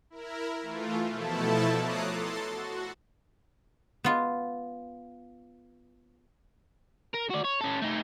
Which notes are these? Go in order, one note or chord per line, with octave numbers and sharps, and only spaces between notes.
E4 A#4
E3 A3 F4
B2 F3 A3 E4 A4 A5
C#5 A#5 D6 D#6 F#6 C7
A4 C6 A6
F#4
B3 F4
A#4
F#4 D5
C#5
C#4 A4
A3 D#4